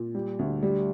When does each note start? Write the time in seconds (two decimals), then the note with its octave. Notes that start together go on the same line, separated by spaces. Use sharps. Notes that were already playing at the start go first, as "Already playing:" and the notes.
Already playing: A#2
0.15 G3
0.39 D2
0.63 G3